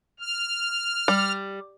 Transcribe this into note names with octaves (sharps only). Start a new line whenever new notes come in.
F6
G3